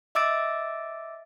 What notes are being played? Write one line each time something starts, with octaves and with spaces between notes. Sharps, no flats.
D#5 E5 D6 E6 A6 D7